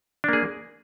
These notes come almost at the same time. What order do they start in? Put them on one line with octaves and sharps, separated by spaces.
D4 A#3 G#4